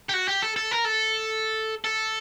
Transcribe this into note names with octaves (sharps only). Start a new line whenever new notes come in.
G4
F#4
G4
A4
A4
A#4
A4
A4